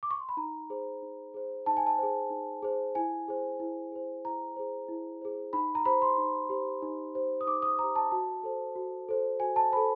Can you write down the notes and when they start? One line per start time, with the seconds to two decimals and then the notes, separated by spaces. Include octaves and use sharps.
0.03 D6
0.11 C#6
0.20 C6
0.29 B5
0.37 D#4 A#5
0.70 G#4 C5
1.02 D#4
1.34 G#4 C5
1.66 D#4 A5
1.77 G#5
1.87 A5
1.98 G#4 C5
2.30 D#4
2.62 G#4 C5
2.95 E4 G#5
3.28 G#4 C5
3.60 E4
3.92 G#4 C5
4.25 E4 A#5
4.56 G#4 C5
4.89 E4
5.22 G#4 C5
5.53 D#4 B5
5.75 A#5
5.85 G4 C5 B5
6.02 C6
6.18 D#4
6.50 G4 C5
6.82 D#4
7.15 G4 C5
7.41 D#6
7.47 D#4 D6
7.62 D#6
7.79 G4 C5 A#5
7.96 A5
8.11 F#4 A5
8.43 A4 C5
8.75 F#4
9.09 A4 C5
9.40 F#4 G#5
9.56 A5
9.72 A4 C5 B5